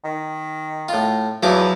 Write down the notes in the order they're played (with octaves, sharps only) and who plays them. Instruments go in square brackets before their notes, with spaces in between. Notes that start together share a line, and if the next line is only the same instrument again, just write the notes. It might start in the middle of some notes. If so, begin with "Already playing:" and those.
[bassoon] D#3
[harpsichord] A2 F4
[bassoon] E2 [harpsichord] F3 E4 D6 [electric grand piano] F#3